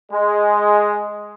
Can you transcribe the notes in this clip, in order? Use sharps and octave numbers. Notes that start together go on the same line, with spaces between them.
G#3